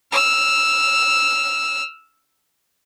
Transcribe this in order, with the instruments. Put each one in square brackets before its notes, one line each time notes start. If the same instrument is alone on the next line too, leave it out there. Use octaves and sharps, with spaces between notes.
[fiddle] E6 F6